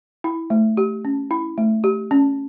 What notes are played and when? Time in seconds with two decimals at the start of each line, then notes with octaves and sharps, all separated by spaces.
0.24 E4
0.50 A3
0.77 G4
1.05 C#4
1.31 E4
1.58 A3
1.84 G4
2.11 C#4